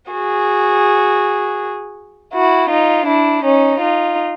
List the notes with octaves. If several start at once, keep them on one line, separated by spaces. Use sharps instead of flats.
F#4 G#4
E4 F#4
D#4 F4
D4 E4
C#4 D#4
D#4 F4